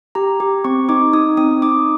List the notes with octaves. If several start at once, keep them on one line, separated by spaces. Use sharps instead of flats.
G4 A#5
G4
C4 C#6
D#4 D6
D#4 D#6
C4 D#6
D#4 D6